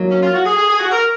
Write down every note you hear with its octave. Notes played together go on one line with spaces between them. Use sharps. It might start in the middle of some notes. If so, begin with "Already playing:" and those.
Already playing: F#3 A#3 D#4
C#4
F4
F#4
G#4
G#4
G#4
F#4
A#4